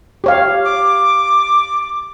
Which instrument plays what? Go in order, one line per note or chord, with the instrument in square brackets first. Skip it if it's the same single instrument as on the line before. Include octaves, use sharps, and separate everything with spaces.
[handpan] G4 C#5 F5
[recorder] D6